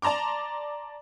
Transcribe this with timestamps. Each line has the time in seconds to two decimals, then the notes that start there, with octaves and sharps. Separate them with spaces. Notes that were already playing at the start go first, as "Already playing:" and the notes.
0.02 D5 A5 A#5 C6 D6